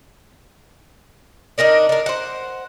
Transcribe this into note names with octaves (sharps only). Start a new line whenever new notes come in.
D4 D#4 A#4 D5
D4 A#4
C5 F#5